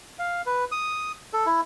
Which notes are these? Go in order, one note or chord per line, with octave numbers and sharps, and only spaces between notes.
F5
B4
D#6
A4
E4